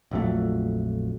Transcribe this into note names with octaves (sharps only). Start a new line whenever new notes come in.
A#1 F2 F#3 A3